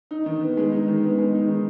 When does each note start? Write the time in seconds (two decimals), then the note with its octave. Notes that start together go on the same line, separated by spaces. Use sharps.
0.11 D#4
0.26 D#3
0.41 B3
0.57 G#3
0.72 D#4
0.88 D#3
1.03 B3
1.19 G#3
1.34 D#4
1.48 D#3